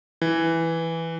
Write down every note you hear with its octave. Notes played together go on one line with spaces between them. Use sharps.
E3